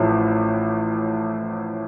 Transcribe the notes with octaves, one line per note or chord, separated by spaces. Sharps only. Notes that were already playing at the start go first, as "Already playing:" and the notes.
Already playing: A1 A2 F3